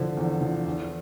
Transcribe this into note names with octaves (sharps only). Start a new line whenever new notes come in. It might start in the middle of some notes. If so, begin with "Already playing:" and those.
Already playing: D3 F3 A4 C5
E2
D3 F3
E2